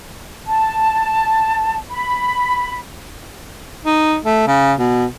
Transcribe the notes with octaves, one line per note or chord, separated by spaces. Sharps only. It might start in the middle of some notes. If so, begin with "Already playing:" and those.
A5
B5
D#4
A3
C#3
B2